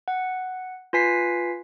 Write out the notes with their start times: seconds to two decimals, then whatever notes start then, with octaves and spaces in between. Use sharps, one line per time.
0.08 F#5
0.93 F4 B4 G#5 B6 C7